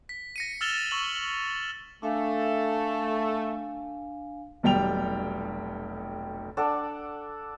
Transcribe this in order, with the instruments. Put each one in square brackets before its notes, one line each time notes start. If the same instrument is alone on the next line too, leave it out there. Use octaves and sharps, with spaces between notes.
[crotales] B6
A#6 C#7 D#7
E6 F6 A6 E7 F7 G7
C#6 E6 F#7
[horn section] A3 [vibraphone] D4 F5 G#5
[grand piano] F1 B1 G3 G5 F7
[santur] D4 A4 D5 F#5